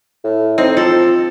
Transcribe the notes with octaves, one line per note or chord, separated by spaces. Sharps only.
A2
C4 D#4
F3 A4